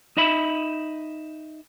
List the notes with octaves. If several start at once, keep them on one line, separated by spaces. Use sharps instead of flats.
D#4 D#5 E5 B5